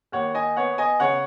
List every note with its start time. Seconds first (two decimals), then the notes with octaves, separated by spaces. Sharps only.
0.12 D#2 C#5 F#5
0.35 D#5 G#5
0.57 B3 C#5 F#5
0.78 D#5 G#5
1.00 C#3 C#5 F#5